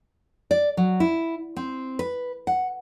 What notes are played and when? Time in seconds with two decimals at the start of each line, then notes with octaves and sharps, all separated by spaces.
0.51 D5
0.77 F#3
1.00 E4
1.56 C4
1.99 B4
2.47 F#5